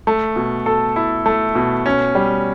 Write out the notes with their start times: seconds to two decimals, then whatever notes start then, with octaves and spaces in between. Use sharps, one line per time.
0.07 A3
0.36 B2
0.66 A4
0.96 E4
1.26 A3
1.55 B2
1.86 C#4
2.15 G3